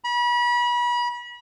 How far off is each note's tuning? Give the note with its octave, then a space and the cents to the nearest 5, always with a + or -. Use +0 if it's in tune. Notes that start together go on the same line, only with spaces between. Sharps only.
B5 -35